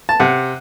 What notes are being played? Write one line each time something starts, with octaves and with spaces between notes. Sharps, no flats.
A5
C3 F#5